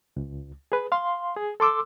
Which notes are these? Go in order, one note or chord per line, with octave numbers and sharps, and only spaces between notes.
C#2
G#4 B4
F5 C6
G#4
A4 C6 D6 E6